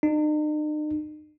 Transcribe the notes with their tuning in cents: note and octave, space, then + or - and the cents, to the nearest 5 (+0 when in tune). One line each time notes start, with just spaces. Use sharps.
D#4 -45